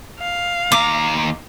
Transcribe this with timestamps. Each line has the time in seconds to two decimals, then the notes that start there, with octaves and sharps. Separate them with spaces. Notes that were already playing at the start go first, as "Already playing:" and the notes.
0.19 F5
0.72 D#2 A#5 D6